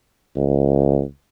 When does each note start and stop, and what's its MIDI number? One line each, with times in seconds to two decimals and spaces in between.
0.36 1.02 37